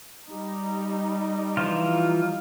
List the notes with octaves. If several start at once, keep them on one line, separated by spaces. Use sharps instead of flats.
G3 D#4
E3 F3 F4